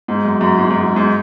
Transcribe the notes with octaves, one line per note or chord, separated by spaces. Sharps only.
G#2
F#2
F#2
G#2
F#2
G#2
G#2